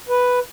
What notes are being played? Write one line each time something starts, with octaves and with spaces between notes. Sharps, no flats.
B4